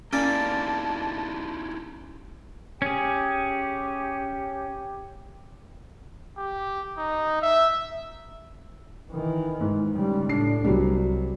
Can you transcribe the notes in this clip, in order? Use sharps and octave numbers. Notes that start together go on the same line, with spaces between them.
A#3 C#4 D#4 E4 G4 D5 A5
C#4 G4 G#4
G4
D#4
E5
D#3 E3
G#2
C#3 G3
A2 D4 C7
C2 F#3 G3